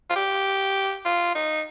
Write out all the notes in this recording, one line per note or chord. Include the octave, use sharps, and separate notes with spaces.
F4
G4
F4
D#4